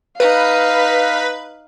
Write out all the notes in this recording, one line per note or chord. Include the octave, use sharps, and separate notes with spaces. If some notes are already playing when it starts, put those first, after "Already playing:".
D#4 B4 F5